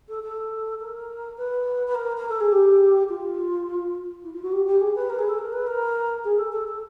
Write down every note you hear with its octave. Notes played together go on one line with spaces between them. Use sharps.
A4
A4
A#4
B4
B4
A#4
A#4
A4
G#4
G4
F4
E4
F4
F#4
G4
G4
G#4
B4
A#4
G#4
A4
A#4
B4
A#4
G#4
A4
A4
A4